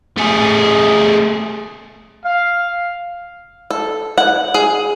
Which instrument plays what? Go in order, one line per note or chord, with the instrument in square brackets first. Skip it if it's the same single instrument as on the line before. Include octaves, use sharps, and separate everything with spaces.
[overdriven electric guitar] A3 G#4
[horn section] F5
[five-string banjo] A4
F#5
G#4